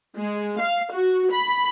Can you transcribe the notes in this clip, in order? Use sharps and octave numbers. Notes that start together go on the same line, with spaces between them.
G#3
F5
F#4
B5